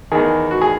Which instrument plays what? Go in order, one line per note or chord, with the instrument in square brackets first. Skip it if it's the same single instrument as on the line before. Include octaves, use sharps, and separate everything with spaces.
[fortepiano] E2 D#3 G#4
F#4
G#4